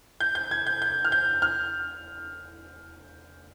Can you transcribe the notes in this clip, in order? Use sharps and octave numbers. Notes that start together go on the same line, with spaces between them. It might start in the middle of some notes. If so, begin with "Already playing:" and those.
G6
G6
G#6
G6
G6
F6
G6
F6